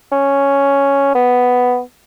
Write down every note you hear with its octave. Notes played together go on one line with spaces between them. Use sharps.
C#4
B3